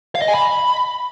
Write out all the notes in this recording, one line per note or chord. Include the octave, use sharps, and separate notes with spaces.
F5
D#5
G#5
B5